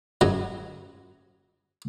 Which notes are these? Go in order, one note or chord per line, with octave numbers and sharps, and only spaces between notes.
F#2 F#3